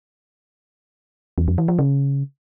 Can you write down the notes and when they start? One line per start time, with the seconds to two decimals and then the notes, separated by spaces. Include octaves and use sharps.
1.38 E2
1.48 F2
1.58 E3
1.68 F3
1.79 C#3